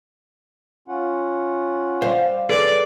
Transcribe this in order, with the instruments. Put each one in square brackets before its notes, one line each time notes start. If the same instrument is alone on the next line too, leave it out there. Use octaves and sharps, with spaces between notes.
[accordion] C#4 F4 F#5
[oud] G3 F5 [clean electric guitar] C5
[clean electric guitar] G#4 A4 B4 [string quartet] D5